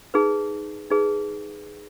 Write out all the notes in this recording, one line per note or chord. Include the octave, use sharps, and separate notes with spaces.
D#4 G#4 B4
D#4 G#4 B4